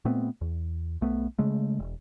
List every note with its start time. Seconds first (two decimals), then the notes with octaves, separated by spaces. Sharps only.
0.05 A#2 A3 B3 C4
0.41 E2
1.01 B1 A3 B3
1.39 C#3 G#3 A3
1.79 E1